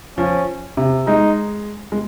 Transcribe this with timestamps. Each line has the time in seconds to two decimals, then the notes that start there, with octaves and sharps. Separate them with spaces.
0.18 F3 C#4
0.77 C3
1.07 G#3 D#4
1.92 G#3